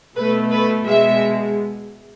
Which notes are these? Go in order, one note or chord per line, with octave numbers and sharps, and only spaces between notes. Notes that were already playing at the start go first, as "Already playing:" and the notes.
B2 A3 B4
B4
B2 G#3 E5